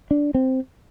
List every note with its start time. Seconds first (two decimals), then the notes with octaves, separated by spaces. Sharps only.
0.11 D4
0.35 C4